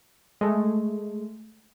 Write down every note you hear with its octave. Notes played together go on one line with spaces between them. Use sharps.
G#3 A3